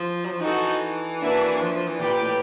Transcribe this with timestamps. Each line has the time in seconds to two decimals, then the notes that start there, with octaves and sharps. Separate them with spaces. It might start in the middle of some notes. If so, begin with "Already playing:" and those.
Already playing: F3
0.25 F#3
0.32 F3
0.41 E3 D#4 F#4 A4
1.21 A#3 D4 F#4 B4 E5
1.61 F3
1.74 F3
1.88 E3
2.00 A#2 G4 B4 D5 G5
2.21 A2